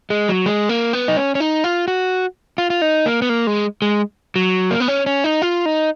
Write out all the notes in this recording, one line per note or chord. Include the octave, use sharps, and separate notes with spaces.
G#3
F#3
G#3
A#3
B3
D#4
C#4
C#4
D#4
F4
F#4
F4
F4
D#4
A#3
B3
A#3
G#3
G#3
F#3
A#3
B3
C#4
C#4
D#4
F4
D#4